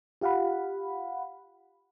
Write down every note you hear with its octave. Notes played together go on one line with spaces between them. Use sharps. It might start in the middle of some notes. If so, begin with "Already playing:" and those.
F4 G4 F5 F#5 B5